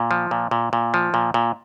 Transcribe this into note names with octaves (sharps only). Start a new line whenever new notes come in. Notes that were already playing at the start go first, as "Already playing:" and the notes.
Already playing: A#2
F3
A#2
A#2
A#2
F3
A#2
A#2